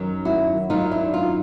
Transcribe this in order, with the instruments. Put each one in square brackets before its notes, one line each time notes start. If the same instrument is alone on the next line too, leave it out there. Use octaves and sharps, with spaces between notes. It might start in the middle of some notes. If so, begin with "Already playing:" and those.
Already playing: [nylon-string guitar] F#2 D#3 F#3
E4 F#4
F#2 D#3 F#3 D#4 F4
D4 E4
D#4 F4